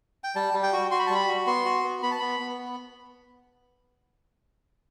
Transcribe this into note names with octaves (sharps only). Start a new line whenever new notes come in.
G5
G3 A5
G3
G5
F#4
F#4 C6
B5
A5
G3 B5
F#4
B3 C6
F#4
B3
B3 B5
A5
B3 B5
B3